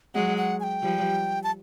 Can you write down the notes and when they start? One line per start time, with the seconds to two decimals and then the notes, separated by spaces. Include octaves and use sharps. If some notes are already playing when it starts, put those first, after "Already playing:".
0.14 F#3 G#3 F#5
0.38 F#5
0.60 G#5
0.63 G5
0.83 F3 G3
1.44 A5